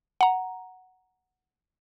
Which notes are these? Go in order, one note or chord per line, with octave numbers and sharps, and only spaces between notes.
F#5 A#5